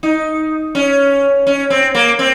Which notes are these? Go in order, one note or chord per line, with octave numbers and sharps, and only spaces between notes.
D#4
C#4
C#4
C4
A#3
C4